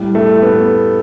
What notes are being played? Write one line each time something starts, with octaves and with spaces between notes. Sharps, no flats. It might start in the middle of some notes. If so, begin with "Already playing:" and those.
Already playing: A2 G3
A3
B3